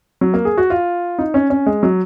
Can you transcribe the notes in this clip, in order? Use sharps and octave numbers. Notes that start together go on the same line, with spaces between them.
F#3
A#3
G#4
F#4
F4
D#4
C#4
C#4
G#3
F#3